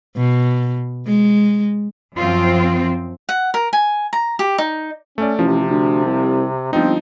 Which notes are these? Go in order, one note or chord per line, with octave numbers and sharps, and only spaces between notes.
B2
G#3
F#2 F3 C4 F4
F#5
A#4
G#5
A#5
G4
D#4
A3 C#4 D5
A1 C3 F3
D2
C2
G1 F3 C4 D#4